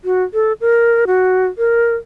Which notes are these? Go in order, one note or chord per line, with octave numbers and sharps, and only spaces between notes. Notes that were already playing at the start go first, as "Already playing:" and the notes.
F#4
A4
A#4
F#4
A#4